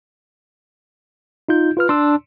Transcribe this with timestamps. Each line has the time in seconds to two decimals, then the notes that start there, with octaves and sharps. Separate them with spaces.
1.49 D#4 F4 G6
1.77 F4 B4 F6
1.89 D4 C6 E6